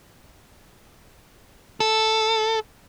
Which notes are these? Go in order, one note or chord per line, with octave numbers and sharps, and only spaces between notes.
A4